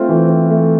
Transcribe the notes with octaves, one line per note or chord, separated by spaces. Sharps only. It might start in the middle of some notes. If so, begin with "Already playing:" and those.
Already playing: A3 C4 F4
E3
C4
A3